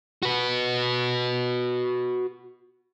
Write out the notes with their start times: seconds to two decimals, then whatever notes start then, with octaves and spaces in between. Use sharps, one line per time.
0.23 F#4 B4